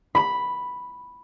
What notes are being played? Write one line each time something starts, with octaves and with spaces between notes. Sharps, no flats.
B5